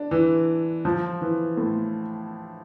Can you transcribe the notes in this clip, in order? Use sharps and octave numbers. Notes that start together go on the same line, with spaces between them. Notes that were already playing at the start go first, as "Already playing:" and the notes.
Already playing: D4
E3
F3
E3
A2